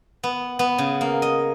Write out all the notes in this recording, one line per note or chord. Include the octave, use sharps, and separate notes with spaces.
B3
B3
C#3
A#3
D#5